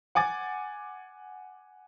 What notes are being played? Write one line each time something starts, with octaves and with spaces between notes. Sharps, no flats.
F#5 G#5 D6 A6